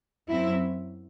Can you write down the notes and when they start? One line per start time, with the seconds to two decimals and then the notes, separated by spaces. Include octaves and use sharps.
0.28 F#2 F#3 C4 E4